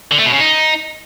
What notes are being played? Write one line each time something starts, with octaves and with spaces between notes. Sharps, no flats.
D3
A3
B2
C#3
D#4